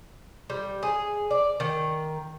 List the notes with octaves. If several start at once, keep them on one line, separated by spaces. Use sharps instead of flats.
G3
G#4
D5
D#3